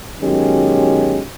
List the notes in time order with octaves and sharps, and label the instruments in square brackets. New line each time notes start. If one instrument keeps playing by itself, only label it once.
[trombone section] B2 D#3 F#3 G#3 C#4 G4